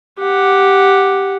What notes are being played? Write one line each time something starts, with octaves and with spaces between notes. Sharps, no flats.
G4 F#5